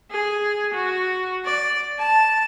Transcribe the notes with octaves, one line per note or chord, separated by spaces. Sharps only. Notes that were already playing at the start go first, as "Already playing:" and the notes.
G#4
F#4
D5
A5